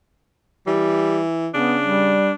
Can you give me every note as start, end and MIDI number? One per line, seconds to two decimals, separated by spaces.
0.67 1.49 52
0.67 1.20 55
1.54 2.15 49
1.54 1.77 59
1.54 2.34 62
1.85 2.30 55